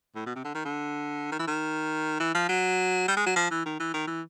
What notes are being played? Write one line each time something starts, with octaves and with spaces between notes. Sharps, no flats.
A2
B2
C3
D3
D#3
D3
D#3
E3
D#3
E3
F3
F#3
G3
G#3
F#3
F3
E3
D#3
E3
D#3
E3